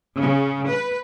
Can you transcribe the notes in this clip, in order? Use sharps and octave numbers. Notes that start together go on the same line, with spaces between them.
C#3
B4